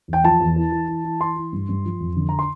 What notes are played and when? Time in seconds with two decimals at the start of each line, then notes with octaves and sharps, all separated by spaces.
0.08 E2
0.13 G5
0.24 F3 A5
0.40 E2
0.56 E3
0.72 E3
0.88 E3
1.04 E3
1.20 E3 C6
1.36 E3
1.52 G2
1.69 G2
1.85 F3
2.01 F2
2.16 D3
2.29 A#5
2.39 C6